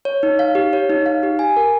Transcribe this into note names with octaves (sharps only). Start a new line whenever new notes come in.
C#5
D#4
F5
G4
C#5
D#4
F5
G4
G#5
A#4